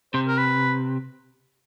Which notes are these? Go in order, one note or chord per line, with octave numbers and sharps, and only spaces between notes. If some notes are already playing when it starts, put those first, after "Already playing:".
C3 C5
A#4
B4